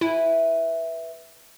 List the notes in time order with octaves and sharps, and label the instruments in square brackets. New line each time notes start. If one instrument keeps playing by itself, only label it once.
[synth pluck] E4 [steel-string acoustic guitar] B4 E5 G#5